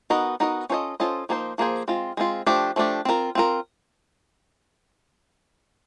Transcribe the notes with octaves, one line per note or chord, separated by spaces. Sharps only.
B3 D#4 F#4 A#4 D#5
B3 D#4 F#4 A#4 D#5
C#4 F4 A4 C5 D#5
C#4 F4 A4 C5 D#5
F3 A#3 D#4 G#4 C5
F3 A#3 D#4 G#4 C5
G#3 C4 F4
G#3 C4 F4
F3 A3 D4 G4
F3 A3 D4 G4
C4 F4 A#4
C4 F4 A#4